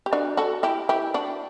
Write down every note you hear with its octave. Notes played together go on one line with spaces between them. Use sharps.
G4
D4 F#4
F#4 A4
E4 G4
E4 G4
D4 F#4